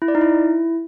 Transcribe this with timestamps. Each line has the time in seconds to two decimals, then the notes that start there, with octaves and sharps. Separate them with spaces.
0.02 E4
0.08 D5
0.15 D#4
0.21 E4